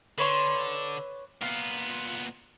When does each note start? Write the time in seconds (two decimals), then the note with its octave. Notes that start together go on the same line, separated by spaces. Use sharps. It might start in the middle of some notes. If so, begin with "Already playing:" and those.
0.18 D3 B4 C#5 C6
1.42 A#2 B3 F4